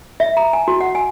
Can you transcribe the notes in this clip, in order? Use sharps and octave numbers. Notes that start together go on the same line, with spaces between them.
E5
A#5
G#5
F#4
F#5
G#5